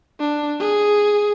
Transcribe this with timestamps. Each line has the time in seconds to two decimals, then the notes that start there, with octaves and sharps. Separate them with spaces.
0.20 D4
0.60 G#4